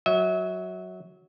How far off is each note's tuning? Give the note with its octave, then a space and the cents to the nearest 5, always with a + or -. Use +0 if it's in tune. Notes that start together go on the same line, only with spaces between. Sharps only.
F#3 +0 E5 -35